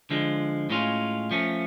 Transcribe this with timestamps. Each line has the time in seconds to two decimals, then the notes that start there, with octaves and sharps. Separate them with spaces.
0.10 D3 F3 G#3
0.70 A2 G#3 C#4 F4
1.31 F3 A3 C#4